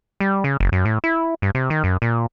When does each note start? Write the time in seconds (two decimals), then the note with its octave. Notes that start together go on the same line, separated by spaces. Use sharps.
0.20 G3
0.44 C#3
0.60 F#1
0.72 F#2
0.85 A2
1.04 E4
1.42 G2
1.55 C3
1.70 D#3
1.84 F#2
2.02 A#2